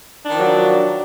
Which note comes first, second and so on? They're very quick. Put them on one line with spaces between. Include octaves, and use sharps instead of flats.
D4 D#3 F3 F#3